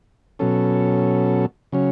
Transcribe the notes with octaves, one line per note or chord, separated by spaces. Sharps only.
B2 F#3 C#4 A4
C#3 F#3 C#4